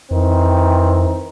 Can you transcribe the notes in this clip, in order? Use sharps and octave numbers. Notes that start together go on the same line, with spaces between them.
F2 D#3 E3 C4